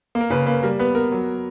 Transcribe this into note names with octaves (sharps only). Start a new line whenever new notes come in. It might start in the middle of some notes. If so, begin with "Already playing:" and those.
A#3
A#4
C#3 B4
A#3 B4
G3 A#4
B3 B4
B3 A#4
F#3